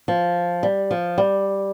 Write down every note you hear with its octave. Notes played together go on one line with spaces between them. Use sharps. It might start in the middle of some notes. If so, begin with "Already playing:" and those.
F3
G3
F3
G3